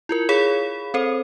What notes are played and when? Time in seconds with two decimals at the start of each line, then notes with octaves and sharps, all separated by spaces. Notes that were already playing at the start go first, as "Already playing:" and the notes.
0.09 E4 F4 A#4
0.29 G#4 C#5 F5 B5
0.94 C4 A4 C5